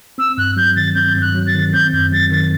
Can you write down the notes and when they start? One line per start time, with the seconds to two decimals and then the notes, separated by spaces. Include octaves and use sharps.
0.18 C4 E6
0.38 G2 F#6
0.57 F#3 G6
0.76 D#3 A6
0.95 C4 G6
1.15 G2
1.22 F#6
1.35 F#3
1.47 A6
1.54 D#3
1.73 C4 G6
1.93 F#2 G6
2.12 F#3 A6
2.32 D#3 A6